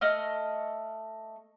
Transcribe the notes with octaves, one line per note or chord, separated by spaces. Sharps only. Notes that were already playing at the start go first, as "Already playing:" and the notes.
A3 D#5 F6